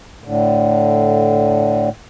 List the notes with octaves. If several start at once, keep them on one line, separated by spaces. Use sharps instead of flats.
A2 D3